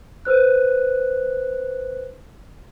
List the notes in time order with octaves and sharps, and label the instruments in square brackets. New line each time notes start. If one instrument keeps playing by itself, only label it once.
[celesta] B4 C5 F#6